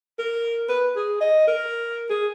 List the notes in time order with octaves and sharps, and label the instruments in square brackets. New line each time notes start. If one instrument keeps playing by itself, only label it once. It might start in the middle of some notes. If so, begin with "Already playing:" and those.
[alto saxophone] A#4
B4
G#4
D#5
A#4
G#4